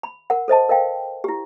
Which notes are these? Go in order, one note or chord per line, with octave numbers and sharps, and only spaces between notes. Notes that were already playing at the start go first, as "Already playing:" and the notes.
B5
A#4 F#5
A4 C5 D#5 A5
A#4 D#5 F5 G5
E4 G4